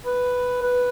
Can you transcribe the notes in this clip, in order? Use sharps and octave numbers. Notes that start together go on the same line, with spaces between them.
B4
B4